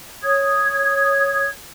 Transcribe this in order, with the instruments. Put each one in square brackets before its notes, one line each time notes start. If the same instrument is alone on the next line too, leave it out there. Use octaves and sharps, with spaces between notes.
[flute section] C#5 D#6 G#6